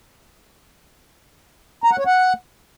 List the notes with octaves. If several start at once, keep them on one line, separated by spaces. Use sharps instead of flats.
A#5
F#5
C#5
F#5